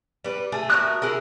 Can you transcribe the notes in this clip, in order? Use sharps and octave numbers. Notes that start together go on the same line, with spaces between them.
G3 B4
A3 G#4
F#4 A#4 E5 D#6 F#6
E4 G#4 A#4